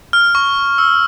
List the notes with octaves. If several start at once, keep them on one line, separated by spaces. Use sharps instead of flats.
F6
C#6
E6